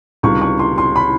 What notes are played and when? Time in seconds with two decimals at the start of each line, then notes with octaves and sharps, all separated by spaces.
0.23 C#2 C3 D#3 G3 C#6
0.41 C#6
0.59 C6
0.78 C6
0.96 B5